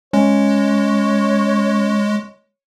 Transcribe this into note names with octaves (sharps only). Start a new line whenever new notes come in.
G#3 C#4 C#5